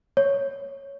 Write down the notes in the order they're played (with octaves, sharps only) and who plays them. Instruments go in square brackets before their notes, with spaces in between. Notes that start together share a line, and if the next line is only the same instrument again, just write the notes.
[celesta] C#5